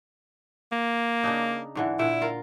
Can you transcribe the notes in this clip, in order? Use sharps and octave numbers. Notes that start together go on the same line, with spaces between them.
A#3
C#3 D4 D#4
G#2 D3 E3
A#2 D3 E4
F4 A#4